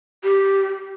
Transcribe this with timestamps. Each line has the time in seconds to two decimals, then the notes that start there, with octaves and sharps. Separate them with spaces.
0.24 G4